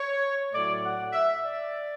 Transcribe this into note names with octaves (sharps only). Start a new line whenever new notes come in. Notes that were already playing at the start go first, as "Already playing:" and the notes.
Already playing: C#5
A2 F#3 A3 D5
F#5
E5
D5